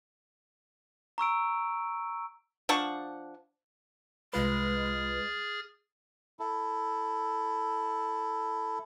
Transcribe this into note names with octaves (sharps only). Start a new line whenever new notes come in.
A#5 C#6 E6 D7
F3 D4 F#5 C#6
C2 G#3 F4 G#4 B4 F6 A6
E4 A4